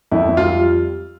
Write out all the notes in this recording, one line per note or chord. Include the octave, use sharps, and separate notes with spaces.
F2 E4
F2
F4
G3